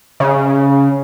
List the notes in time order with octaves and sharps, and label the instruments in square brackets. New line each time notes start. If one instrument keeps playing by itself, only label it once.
[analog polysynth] C#3